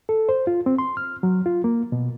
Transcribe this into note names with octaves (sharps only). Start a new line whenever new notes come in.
A4
C5
F4
C4
C6
F6
F#3
F4
A#3
B2